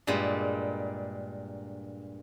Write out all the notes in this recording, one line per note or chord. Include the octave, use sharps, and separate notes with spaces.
G2 A#2 G3 G#3